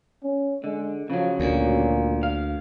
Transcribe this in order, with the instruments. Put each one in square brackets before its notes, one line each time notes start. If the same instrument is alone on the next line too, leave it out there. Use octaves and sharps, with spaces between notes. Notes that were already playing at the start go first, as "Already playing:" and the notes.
[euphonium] C#4
[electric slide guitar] D3 [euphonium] G#3
[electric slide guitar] C#3 F#3 [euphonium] F3
[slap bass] D2 [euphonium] A#2
[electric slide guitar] F5